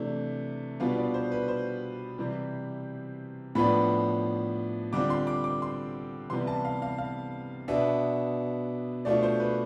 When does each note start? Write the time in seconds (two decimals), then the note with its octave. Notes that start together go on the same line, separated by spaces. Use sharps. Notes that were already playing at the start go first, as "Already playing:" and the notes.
Already playing: C3 E3 A3 D4
0.80 B2 G3 B3 D4 F4 F5
0.98 D5
1.14 C5
1.32 B4
1.48 C5
2.18 C3 E3 G3 C4
3.55 A2 F3 B3 D4 B5
4.93 D3 G3 C4 F4 D6
5.10 C6
5.27 D6
5.44 D6
5.62 C6
6.30 C3 E3 G3 B3 E4 C6
6.47 A5
6.65 F5
6.82 F5
6.98 F5
7.68 B2 B3 D4 E5
9.05 B2 A3 D4 F4 D5
9.23 C5
9.40 B4